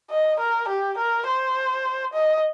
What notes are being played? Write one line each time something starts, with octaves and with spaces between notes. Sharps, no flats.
D#5
A#4
G4
A#4
C5
D#5